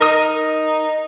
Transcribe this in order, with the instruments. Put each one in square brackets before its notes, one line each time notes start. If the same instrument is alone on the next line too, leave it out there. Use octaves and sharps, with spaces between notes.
[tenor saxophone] D#4 [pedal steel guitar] A#4 D#6